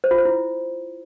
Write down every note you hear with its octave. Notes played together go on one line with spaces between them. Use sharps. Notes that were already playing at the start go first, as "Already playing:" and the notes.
C5
F4
C5
E4